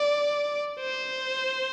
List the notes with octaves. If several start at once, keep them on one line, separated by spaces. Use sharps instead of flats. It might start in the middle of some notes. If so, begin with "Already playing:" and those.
Already playing: D5
C5